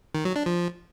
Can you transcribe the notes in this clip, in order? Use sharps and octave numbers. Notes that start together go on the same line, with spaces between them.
D#3
F#3
D4
F3